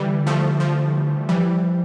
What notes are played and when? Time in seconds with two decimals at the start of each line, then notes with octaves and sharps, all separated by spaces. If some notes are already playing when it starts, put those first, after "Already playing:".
Already playing: D3 E3 G3
0.27 F3 A3
0.60 F3
1.29 E3 F3 G3